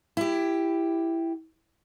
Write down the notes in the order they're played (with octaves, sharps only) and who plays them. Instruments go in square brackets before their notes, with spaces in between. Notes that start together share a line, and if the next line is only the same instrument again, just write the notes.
[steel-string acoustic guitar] E4 G4